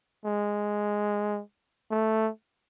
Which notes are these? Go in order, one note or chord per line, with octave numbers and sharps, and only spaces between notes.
G#3
A3